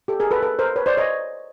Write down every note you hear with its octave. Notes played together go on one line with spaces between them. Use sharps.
G4 A4
G#4 A#4
A4 B4
A4 B4
A#4 C5
B4 C#5
C5 D5
C#5 D#5